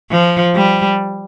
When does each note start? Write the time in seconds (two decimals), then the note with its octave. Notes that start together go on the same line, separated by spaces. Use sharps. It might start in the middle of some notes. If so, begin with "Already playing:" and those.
0.11 F3
0.56 G3